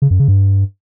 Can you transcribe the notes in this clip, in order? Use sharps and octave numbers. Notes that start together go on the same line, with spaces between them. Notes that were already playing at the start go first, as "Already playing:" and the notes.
C#3
F#2
C#3
G2